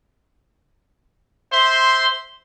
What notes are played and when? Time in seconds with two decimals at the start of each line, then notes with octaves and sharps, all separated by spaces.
1.53 C5 E5 C6